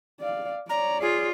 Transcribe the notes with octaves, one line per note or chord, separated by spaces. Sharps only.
D5 F5
C#5 D5 A#5
F4 G#4